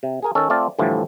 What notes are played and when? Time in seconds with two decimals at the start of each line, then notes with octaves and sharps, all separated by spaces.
0.03 C3
0.23 G#4 A#4 G#5
0.35 D#3 C#4 A4
0.50 A3 C4 F4 D5 F5 A5
0.79 A2 D3 E3 F3 G3 A3